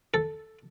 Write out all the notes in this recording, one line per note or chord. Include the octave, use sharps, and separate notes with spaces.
A4